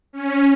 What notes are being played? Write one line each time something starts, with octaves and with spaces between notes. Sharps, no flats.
C#4